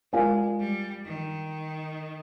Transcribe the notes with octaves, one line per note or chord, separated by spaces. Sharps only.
G#3 F4 A#4 D5 F5 G#5
G3
D#3